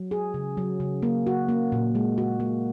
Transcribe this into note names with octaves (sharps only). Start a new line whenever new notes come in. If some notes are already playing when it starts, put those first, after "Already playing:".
Already playing: F#3
G#4
C#3
F#3
C#3
A#3
F#4
A#3
A#2
G#3
F#4
A#3